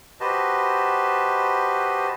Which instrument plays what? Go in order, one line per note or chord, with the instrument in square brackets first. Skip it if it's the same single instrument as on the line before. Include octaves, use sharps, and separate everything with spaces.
[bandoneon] F#4 G4 B4 C5 D#5 A5